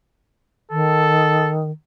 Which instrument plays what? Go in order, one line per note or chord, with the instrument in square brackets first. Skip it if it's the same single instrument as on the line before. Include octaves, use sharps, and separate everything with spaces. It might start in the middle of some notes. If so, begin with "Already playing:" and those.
[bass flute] D#3 [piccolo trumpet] A4